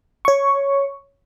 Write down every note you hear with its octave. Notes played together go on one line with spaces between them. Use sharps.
C#5 C#6